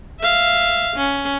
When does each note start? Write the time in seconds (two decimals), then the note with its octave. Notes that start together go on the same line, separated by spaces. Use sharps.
0.20 E5 F5
0.96 C#4